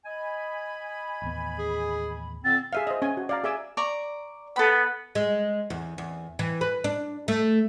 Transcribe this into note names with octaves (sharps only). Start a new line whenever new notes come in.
D#5 G#5 B5
A1 D#2 B3
G#4
A#2 D3 C4 E6 A6
G#4 E5 F5
C5 D#5
C#4 G#5
F#4
D5 F5 A#5
G#4 D5 E5 G#5 D6 E6
D5 A#5 C#6
B3 A4 B5
G#3
E2
E2
E3
B4
D4
A3